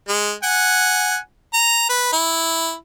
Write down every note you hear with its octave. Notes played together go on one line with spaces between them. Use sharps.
G#3
F#5 G#5
A#5
B4
E4